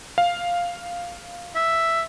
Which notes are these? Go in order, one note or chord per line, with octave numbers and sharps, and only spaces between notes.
F5
E5